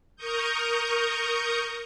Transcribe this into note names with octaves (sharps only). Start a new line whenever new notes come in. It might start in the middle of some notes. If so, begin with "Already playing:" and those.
A#4 A#5 C#6 D#6 G6